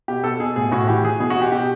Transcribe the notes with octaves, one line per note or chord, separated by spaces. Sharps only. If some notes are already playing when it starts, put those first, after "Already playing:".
B2 G4
B2 A4
B2 G#4
A2 G#4
A2 F#4
E3 G4
E3 G#4
B2 G#4
F#4
B2
G4
B2 G4